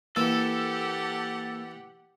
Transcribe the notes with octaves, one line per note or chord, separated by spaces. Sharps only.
E3 A#3 G4 A4 F#5 E6 A6